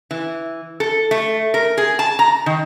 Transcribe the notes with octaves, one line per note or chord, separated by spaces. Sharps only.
E3
A4
A3
A#4
G#4
A5
A#5
D#3